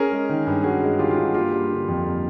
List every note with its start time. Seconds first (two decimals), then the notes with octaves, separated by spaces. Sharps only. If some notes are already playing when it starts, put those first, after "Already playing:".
Already playing: C#4 G#4 A#4
0.12 G#3
0.29 D#3
0.47 G2
0.64 C#4 F#4 G#4
0.82 G#3
0.99 D#3 F4 G4
1.11 F4
1.17 G2
1.23 F#4
1.34 A#3 F4 G4
1.52 G3
1.71 D3
1.88 F2
2.05 A#3